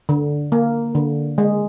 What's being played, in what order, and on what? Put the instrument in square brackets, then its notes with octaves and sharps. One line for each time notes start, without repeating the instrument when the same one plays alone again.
[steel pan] D3
A#3
D3
G#3